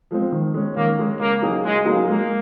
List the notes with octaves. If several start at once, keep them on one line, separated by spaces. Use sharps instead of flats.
F3 G#3 C4
D#3
G#3 C#4
D#3 A#3
G#3 C#4
C#3 A#3
F#3 A#3 D#4 G#4
C#3 G#3
F#3 A#3 D#4 G#4
G#3 A#3